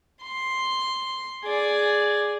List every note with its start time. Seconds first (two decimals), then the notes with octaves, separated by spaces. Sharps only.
0.22 C6
1.44 G#4 D5